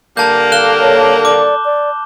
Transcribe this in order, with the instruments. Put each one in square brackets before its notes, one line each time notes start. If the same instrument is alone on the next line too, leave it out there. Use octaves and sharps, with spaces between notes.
[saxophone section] G2 D3 A#3 [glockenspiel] A5 G6
[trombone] A4 [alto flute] F5 [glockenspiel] F#6 E7 G7
[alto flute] C#5
[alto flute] D5 [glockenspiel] D6
[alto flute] D5